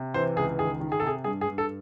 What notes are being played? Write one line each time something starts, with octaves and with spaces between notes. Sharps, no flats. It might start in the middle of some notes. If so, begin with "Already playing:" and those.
Already playing: C3
E3 C5
C#2 G#4
D#3 G#4
D#3
G#4
A4
C3 G#4
G2 G#4
G#4
G2
A4